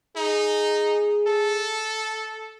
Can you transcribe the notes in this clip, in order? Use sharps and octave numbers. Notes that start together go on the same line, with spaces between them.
D#4 G#4
A4